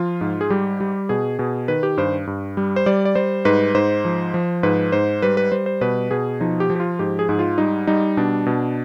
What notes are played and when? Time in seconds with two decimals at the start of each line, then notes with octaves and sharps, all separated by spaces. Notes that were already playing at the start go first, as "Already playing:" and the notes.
Already playing: F3 F4
0.21 G#2
0.41 G#4
0.50 G3 G4
0.81 G3
1.09 B2 G#4
1.39 B2 G#4
1.68 D#3 B4
1.83 G4
1.97 G2 C5
2.27 G2
2.57 G3
2.76 C5
2.86 G3 D5
3.05 D5
3.15 G3 C5
3.45 G#2 B4
3.74 G#2 C5
4.05 F3
4.34 F3
4.63 G#2 B4
4.92 G#2 C5
5.22 G3 B4
5.37 B4
5.52 G3 C5
5.66 C5
5.81 B2 B4
6.11 B2 G#4
6.41 F3 D#4
6.60 G4
6.70 F3
6.75 G4
6.80 F4
6.99 G#2 G4
7.19 G#4
7.29 G#2
7.39 F4
7.58 G3 D#4
7.87 G3 D#4
8.17 B2 D4
8.46 B2